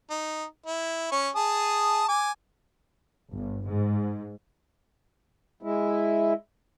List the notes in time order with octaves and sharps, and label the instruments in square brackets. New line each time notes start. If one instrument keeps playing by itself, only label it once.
[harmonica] D#4
E4
C#4 C#6
G#4 A5 D#6
G#5 D6
[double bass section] G1
G#2
[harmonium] G#3 E4